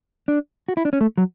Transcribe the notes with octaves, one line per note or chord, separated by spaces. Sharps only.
D4
F#4
E4
D4
C#4
A3
F#3